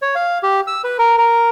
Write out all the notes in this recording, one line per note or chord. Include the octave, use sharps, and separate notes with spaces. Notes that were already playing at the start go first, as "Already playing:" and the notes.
C#5
F5
G4
E6
B4
A#4
A#4